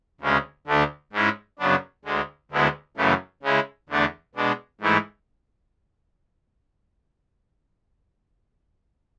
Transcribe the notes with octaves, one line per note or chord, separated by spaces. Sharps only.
D2 C#3 G#3 C#4
D2 D3 A3 D4
G#2 G#3 C#4 E4
F#2 C#3 F#3 B3 D4
D2 D3 G#3
D2 D3 G#3 B3 E4
F#2 C#3 E3 A3
C#3 G#3 C#4 E4
E2 D3 A3 D4
B2 G#3 D4
G#2 E3 A3 E4